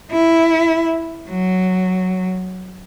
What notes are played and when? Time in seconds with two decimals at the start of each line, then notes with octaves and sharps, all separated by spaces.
0.11 E4
1.29 F#3